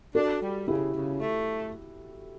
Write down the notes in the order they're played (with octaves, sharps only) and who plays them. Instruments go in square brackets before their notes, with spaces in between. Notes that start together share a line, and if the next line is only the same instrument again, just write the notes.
[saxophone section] D4 [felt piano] F#4 A4
[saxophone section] G3
[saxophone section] C#3 [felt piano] E4 G4
[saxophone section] C#3
A3